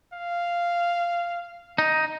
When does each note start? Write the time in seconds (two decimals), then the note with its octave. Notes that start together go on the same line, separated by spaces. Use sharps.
0.13 F5
1.78 D#4